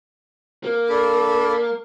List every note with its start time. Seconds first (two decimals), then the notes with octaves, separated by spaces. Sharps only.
0.64 A#3
0.89 D4 A4 B5